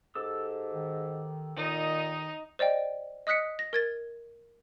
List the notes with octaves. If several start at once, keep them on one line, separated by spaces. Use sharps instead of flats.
G#2 G4 A4 E6
D#3
A#2 D#3 D#4 D#5
C5 D5 D#5 G5
D#5 D#6 F#6 B6 C#7
A#6
A#4 G#6 A6